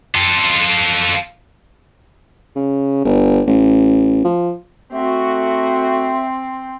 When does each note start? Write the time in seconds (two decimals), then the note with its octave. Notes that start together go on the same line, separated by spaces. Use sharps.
0.15 F4 A4
2.56 C#3
3.05 G1
3.47 A1
4.25 F3
4.93 A3 C4 F#4 E5